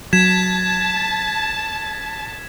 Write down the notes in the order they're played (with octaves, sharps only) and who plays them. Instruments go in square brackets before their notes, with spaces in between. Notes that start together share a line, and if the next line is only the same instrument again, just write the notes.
[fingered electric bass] F#3 [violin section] A5 [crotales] G#6 B6 E7